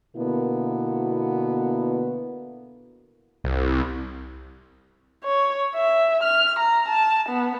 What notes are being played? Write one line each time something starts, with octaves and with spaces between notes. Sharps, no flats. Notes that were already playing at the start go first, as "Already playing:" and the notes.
B2 D3 A#3 B3 E4 F#4
C2
C#5
E5
F6
A#5
A5
B3